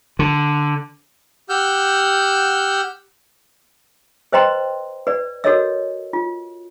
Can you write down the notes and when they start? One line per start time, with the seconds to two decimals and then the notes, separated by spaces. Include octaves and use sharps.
0.19 D3
1.49 G4 F#5 E6 F6 G6
4.33 B4 C5 D#5 G5 A#5 C6
5.07 B4 D5
5.44 F#4 A4 A#4 C#5 D#5 E6
6.13 F4